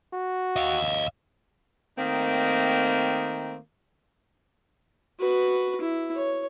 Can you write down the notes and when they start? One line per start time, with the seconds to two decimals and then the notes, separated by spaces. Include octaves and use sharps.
0.13 F#4
0.56 D#5 F5
1.98 D#3 A3 A#3 C4 D#4
5.20 F#4 B4
5.81 E4
6.16 C#5